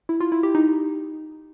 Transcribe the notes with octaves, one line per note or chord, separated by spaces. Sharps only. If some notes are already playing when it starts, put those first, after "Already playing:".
E4
F4
E4
G4
D#4